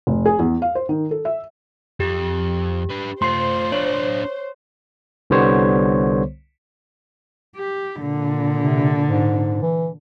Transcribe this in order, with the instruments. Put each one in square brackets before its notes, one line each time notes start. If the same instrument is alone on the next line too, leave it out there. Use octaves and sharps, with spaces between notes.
[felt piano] F1
G#4
E2
F5
C5
D#3
A4
E5
[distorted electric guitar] F2 [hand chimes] G4
[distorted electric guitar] D4 B4
[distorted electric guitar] A3 F4 [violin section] C5 [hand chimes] C6 C7
[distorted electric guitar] D4 F4 [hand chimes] C#5
[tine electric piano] C2 D3 G3 B3 C5 C#5
[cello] G4
A#2 D3
[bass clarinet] C3
G#2
E3